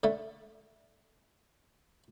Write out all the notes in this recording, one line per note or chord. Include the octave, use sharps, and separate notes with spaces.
D3 A3